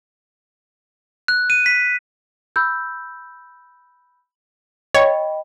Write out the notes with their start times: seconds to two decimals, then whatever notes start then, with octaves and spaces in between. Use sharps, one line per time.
1.28 F#6
1.50 D#7
1.66 B6
2.56 B5 E6 G6
4.95 C#5 D#5 G5 B5